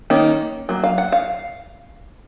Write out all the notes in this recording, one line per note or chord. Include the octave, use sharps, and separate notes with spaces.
D#3 A#3 C#4
F#3 A#3
F5
F#5
F5